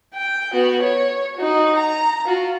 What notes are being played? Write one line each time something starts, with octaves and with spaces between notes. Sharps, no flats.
G5
B3 F#4
C#5
D#4 F#4
A#5
F4 F#4